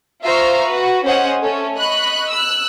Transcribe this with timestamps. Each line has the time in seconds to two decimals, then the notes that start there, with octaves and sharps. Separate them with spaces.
0.23 F4 C5 E5 F5 A#5 C#6
0.66 F#4 B4
1.04 C#4 G#4 C5 D#5 F#5
1.40 A3 C#4 A4
1.74 D#5 B5 C#6 F#6
2.30 E6 F#6